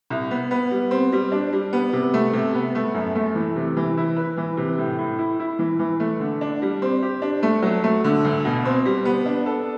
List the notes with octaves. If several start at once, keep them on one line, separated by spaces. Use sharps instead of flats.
C2
B3
B3
G3
C4
G3
D4
G3
B3
C3
A3
C3
B3
A3
F#2
A3
E3
C3
E3
E4
B4
E3
C3
A2
A2
E4
E4
E3
E3
A3
D3
D4
G3
C4
G4
D4
A3
F#3
A3
D3
D2
B2
C4
G3
B3
D4
A4